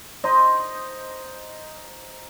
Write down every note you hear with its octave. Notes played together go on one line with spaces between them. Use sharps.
D#4 C5 D#5